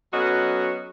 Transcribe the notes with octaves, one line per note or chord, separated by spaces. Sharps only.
F#3 B3 C#4 F#4 A4 D#5